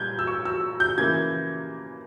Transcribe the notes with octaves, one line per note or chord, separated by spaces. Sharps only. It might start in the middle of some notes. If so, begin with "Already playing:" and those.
Already playing: A#2 G3 G6 G#6
E6
C#6
E6
G6
C#3 E3 A#3 E4 G#6